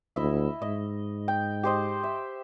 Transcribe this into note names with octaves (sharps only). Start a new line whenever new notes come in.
D2 E4 D#5 E5
G#2 D#5
G5
G4 C5 D#5
E5